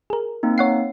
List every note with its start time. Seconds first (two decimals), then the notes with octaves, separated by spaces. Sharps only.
0.10 G#4 A#4
0.43 A#3 C4 D#4
0.58 C#5 F#5 C7